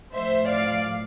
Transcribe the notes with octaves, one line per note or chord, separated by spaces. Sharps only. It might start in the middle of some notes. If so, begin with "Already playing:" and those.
A2 F3 C5 E5
D5 F5